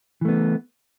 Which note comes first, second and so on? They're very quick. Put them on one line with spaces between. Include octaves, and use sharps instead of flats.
E3 A3 B3